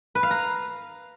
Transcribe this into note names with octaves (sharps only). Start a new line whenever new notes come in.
B4
F5
A#5